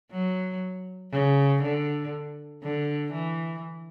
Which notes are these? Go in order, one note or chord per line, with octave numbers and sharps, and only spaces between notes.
F#3
C#3
D3
D3
E3